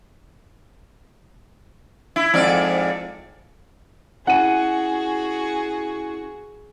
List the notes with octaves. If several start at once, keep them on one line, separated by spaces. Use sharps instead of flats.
E4
F2 G#2 D5
C#4 E4 F#4 G#4 F#5 G#5 D#7